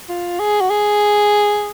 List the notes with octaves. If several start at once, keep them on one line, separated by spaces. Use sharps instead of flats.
F4
G#4
F#4
G#4